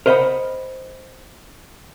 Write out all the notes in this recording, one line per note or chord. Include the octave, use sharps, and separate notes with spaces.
A#4 C5 D#5 F5 F#5 B5